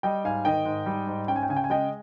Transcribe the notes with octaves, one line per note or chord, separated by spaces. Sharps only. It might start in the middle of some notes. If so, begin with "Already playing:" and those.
G3 D#5 G5
G#2 F5 G#5
D#3 D#5 G5
G#2
G3
G#2
C#4 G5
G#5
G5
C#3 G#5
G5
G#5
G#3 D#5 G5